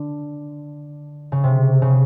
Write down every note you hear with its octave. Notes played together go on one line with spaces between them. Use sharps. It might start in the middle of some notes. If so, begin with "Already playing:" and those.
Already playing: D3
C#3
C3
C#3